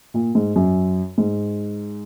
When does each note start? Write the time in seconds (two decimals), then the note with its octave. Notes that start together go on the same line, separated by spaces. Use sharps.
0.14 A#2
0.35 G#2
0.56 F#2
1.18 G#2